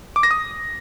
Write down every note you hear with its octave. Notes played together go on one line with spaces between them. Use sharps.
D6
A#6
D#6